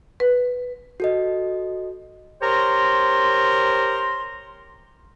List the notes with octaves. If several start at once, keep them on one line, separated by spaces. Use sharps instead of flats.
B4
F#4 A4 D#5
G4 A#4 C5 C#5 A#5 C6